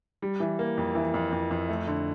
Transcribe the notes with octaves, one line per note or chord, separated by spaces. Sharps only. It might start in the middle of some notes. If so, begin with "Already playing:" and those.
G3
E3
A#3
F2
E3
F2
F2
F2
A3
D3